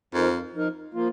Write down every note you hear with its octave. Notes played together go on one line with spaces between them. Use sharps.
F2 F3 D#4 A#4
F3 D#4 A#4
F3 A#3 F4